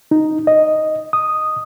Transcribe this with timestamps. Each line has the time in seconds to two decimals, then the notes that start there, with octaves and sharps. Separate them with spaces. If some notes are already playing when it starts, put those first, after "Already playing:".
0.11 D#4
0.47 D#5
1.13 D#6